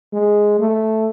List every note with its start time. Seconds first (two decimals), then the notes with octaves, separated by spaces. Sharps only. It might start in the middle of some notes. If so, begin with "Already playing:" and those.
0.13 G#3
0.60 A3